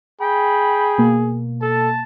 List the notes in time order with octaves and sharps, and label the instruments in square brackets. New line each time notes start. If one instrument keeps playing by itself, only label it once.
[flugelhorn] G#4 [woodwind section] G5 B5
[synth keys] B2 A#3
[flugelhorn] A4 [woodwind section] A5